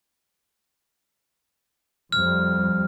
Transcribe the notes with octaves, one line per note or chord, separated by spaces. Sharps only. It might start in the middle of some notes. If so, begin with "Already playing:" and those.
F2 G3 F6